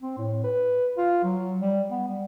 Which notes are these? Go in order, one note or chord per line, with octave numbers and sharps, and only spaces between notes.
C4
A2
B4
F4
F#3
G3
B3
G3